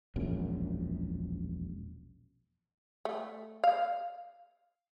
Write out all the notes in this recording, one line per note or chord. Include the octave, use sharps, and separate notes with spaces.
E1 A#1 F#2
A3
F5